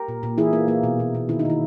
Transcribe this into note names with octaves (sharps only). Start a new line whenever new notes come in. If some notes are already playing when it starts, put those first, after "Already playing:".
Already playing: G4 A#4
A#2
A#2
E3 E4 G#4
A#3
A#3
B2
B2
B2
D#3 E4
D#4
D#3 E4